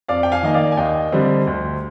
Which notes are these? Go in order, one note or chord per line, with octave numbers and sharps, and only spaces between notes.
F2 D5 F5
G5
F5 G#5
D#3 A#3 D#5
D5 F5
G#5
D#2 D#5 G5
D3 G3 C4
D2